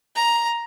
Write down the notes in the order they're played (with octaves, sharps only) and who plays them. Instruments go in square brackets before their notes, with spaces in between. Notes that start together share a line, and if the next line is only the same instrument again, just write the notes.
[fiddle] A#5